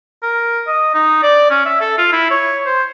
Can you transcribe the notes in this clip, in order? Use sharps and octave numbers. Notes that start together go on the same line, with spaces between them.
A#4
D#5
D#4
D5
C#4
E5
A4
F4
E4
C#5
C5